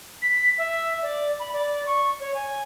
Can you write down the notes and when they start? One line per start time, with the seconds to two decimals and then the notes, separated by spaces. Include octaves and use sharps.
0.22 B6
0.58 E5
1.02 D5
1.40 B5
1.53 D5
1.86 C#6
2.20 C#5
2.34 G#5